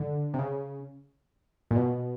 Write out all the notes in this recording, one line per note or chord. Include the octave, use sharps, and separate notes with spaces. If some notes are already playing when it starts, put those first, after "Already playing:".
Already playing: D3
C3
C#3
A#2
B2